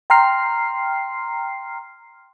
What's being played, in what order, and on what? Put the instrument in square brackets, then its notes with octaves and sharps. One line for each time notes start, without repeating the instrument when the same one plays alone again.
[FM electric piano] G5 A#5 C6 F6 C7